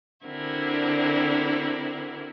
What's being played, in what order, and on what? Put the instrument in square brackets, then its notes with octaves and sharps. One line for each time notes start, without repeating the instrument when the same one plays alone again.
[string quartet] D3 C4 D4 E4 F#4 A#4